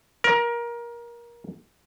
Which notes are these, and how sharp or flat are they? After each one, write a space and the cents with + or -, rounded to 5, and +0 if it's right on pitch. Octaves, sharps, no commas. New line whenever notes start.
A#4 +20